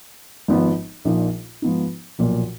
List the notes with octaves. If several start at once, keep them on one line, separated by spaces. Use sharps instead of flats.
G#1 G#2 F3 B3
A#1 A#2 F3 A#3 D#4
G#2 F3 B3 D#4
B1 A#2 F3